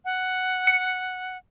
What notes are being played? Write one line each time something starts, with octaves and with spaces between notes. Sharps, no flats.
F#5
C#7